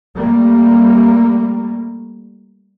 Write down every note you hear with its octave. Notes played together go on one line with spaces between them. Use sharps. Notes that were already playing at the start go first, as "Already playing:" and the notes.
G3 A3 A#3